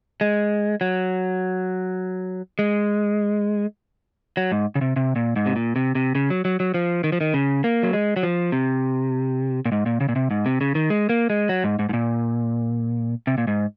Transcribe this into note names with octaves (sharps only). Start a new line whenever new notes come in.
G#3
F#3
G#3
F#3
G#2
C#3
C3
C3
A#2
G#2
C3
A#2
C3
C3
C#3
F#3
F#3
F#3
F3
D#3
F3
D#3
C#3
A#3
F#3
G#3
F#3
F3
C3
A#2
G#2
A#2
C#3
A#2
C3
G#2
C3
C#3
D#3
G#3
A#3
G#3
F#3
G#2
G#2
G#2
A#2
C3
A#2
G#2